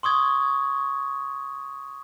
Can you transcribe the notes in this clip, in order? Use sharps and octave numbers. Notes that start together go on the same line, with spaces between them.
C6 C#6 D#6 G#6